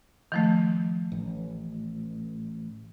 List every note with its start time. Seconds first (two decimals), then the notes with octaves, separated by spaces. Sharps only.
0.32 D#3 F3 A3
1.12 A1